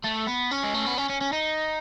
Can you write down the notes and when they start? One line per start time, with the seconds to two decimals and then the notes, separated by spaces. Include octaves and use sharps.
0.04 A3
0.27 B3
0.51 C#4
0.63 G#3
0.74 A3
0.86 B3
0.97 C#4
1.09 C#4
1.21 C#4
1.33 D#4